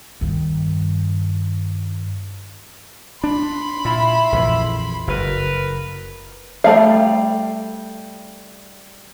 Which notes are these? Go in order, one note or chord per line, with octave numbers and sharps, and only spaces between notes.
G2 D#3
D4 B5 C6
A#2 E4
A#1 F2 E3
F#1 A#4 B4
G3 A3 F5